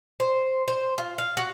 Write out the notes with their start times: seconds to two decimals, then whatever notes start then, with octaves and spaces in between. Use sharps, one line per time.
0.20 C5
0.68 C5
0.98 F4
1.18 F5
1.37 F#4